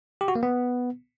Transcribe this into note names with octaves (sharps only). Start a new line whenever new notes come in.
G4
F#4
A#3
B3